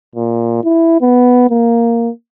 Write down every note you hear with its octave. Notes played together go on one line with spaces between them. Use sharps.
A#2
E4
B3
A#3